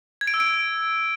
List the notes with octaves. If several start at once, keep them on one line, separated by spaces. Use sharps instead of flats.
G#6
D7
E6
D7